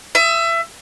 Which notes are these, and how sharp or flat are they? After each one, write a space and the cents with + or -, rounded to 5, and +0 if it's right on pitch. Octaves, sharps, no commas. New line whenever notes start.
E5 +25 D#6 +45